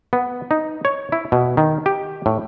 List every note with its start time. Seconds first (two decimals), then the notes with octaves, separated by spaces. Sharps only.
0.13 B3
0.51 D#4
0.85 C#5
1.12 E4
1.32 B2
1.57 D#3
1.86 G4
2.26 A2